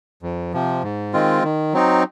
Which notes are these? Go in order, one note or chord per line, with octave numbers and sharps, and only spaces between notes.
F2
C3 F3
G#2
D#3 G#3 C4 F4
D#3
F#3 C4 D#4